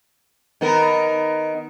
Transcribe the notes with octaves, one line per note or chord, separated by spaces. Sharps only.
D#3 B3 A#4